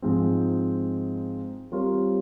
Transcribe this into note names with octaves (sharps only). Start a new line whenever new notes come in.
G#2 F3 G#3 C4
G3 C4 F4 A#4 C#5